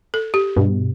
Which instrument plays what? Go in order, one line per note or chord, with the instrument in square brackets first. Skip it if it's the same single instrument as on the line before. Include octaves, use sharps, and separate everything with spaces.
[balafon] A4
G4
[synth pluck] G2 B2